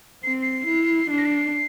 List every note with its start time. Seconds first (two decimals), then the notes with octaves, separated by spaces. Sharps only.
0.23 C4 C7
0.42 C7
0.67 E4
1.11 D4 C7
1.18 A#6
1.25 C7